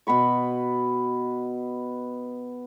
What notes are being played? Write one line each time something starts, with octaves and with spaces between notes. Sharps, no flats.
B2 B3 B5 C#6